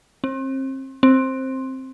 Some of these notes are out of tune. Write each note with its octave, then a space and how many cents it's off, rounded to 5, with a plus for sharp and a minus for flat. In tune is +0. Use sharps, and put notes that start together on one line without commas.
C4 +35
C4 +10